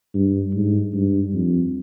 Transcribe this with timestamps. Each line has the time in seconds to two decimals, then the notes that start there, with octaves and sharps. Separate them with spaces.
0.14 G2
0.54 G#2
0.94 G2
1.34 F2